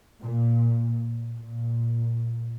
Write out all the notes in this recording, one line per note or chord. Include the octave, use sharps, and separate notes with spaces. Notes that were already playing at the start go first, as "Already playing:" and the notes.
A#2
A#2